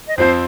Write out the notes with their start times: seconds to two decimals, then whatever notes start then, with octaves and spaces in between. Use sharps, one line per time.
0.08 D#5
0.17 F2 F3 C4 C5